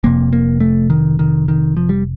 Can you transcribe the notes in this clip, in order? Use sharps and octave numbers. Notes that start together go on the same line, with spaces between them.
F1 F2 C3 A#3
A#3
A3
D#3
D#3
D#3
F3
G3